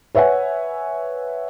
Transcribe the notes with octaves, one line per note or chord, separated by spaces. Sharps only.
B4 C#5 E5 F#5 G#5